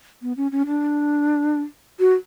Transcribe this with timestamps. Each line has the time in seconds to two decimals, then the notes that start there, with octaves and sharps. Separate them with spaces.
0.22 B3
0.37 C#4
0.52 C#4
0.67 D4
2.00 F#4